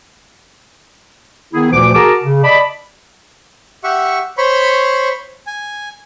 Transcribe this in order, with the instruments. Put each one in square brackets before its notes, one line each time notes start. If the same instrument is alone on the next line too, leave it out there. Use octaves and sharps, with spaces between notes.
[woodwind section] D#3 B3 E4 G#4
D2 A#2 E3 F3 D6
F#4 G#4 A#4 A5 A#5 D6
C#3
D5 D#5 A5 B5
[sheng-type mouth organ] G4 E5 F#5 C#6
C5 C#5 B5 C#6
G#5